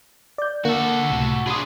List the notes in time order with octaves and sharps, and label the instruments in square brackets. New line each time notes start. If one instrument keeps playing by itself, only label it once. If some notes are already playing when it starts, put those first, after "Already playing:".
[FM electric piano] D5 G6
[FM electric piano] D3 A#3 [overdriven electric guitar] F#4 A4
[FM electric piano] C#2 A2 C3
[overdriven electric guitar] D4 G#4 [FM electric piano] B5 C6 D#6